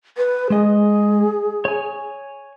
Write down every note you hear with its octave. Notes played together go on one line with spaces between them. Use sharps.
B4
G#3 G#4 D#5
C#5 G#5